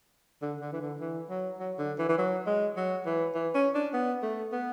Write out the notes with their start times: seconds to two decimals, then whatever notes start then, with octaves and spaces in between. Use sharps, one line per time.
0.42 D3
0.61 D3
0.73 E3
0.81 D3
1.00 E3
1.30 F#3
1.59 F#3
1.79 D3
1.99 E3
2.09 E3
2.18 F#3
2.47 G#3
2.77 F#3
3.06 E3
3.35 E3
3.54 C#4
3.75 D4
3.94 B3
4.23 A3
4.52 B3